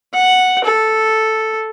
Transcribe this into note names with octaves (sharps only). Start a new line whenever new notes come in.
F#5
A4